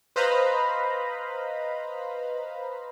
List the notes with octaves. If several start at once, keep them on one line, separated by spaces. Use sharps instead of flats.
B4 C5 D#5 F5 A#5 B5